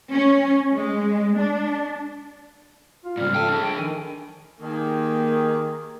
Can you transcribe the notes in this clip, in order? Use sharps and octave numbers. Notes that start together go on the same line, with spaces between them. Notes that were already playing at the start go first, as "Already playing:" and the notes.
C#4
G#3
D4
F4
G#2 C#3 G3 F6
A4 G5 A5
D4 G#4
G5
D#3 G#5
D#3 A#3 G4 G#4